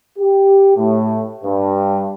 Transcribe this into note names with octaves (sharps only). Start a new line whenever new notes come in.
G4
A2
G2